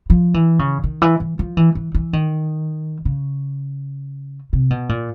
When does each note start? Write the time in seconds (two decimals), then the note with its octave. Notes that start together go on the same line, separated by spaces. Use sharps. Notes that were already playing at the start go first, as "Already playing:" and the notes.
0.10 F3
0.34 E3
0.59 C#3
0.84 D#3
1.02 E3
1.20 E3
1.39 F3
1.57 E3
1.75 E3
1.94 E3
2.13 D#3
3.05 C#3
4.53 C3
4.70 B2
4.89 A#2